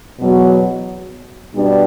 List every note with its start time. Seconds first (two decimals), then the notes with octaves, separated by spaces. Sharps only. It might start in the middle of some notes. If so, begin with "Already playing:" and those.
0.19 E2 B2 F#3 B3 F#4
1.55 B2 G3 B3 D4